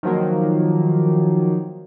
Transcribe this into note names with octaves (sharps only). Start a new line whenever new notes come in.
D#3 F3 F#3 A#3